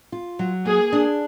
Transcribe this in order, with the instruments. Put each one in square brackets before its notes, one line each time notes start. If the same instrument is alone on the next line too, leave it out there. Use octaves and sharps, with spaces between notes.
[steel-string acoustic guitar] F4
F#3
[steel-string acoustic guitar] A#3 [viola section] G#4
[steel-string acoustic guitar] D4